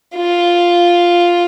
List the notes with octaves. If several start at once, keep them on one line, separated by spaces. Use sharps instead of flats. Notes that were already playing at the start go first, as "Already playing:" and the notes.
F4